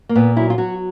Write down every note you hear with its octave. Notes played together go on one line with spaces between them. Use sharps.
A#3
A#2 B3
F#3 E4
F4
F#3 F#4